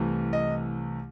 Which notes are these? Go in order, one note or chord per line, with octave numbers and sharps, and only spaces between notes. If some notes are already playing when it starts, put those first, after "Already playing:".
Already playing: C2 C3 E3 A3
D#5